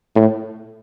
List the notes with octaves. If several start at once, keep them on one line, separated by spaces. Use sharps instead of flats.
A2